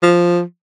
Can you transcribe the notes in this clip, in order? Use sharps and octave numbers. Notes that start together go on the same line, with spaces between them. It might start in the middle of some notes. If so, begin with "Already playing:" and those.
F3